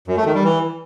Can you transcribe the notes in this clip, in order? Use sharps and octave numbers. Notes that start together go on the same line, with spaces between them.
F#2
A3
D#3
G3
E3